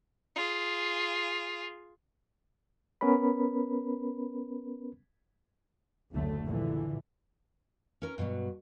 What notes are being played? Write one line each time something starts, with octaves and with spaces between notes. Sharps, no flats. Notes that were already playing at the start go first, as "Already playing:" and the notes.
F4 G#4
B3 C#4 A#4 B4 B5
F#1 D2 D3 F#3 A3
A#1 D3 E3
C#4 A#4 A#5
G2 B2 F3 F#3